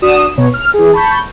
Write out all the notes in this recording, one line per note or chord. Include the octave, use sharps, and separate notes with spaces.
D4 F#4 D#6 E7
B2 B3 C#5
F6
E3 G#4
A5 B5 C#6 G6